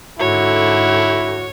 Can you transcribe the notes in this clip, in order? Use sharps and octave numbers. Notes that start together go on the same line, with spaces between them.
G#2 D3 E4 F#4 A4 C#5